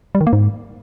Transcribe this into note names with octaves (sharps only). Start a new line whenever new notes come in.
G3
D#3
A#3
G#2